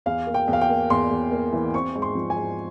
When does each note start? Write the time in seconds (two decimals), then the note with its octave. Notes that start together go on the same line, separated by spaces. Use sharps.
0.06 E2 F5
0.27 A#3
0.34 G5
0.47 E2
0.53 F5
0.61 G5
0.69 A#3
0.90 E2 C6
1.10 E2
1.31 A#3
1.52 E3
1.74 C4 C#6
1.95 G#2
2.02 C6
2.15 F3
2.30 G#5
2.36 G#2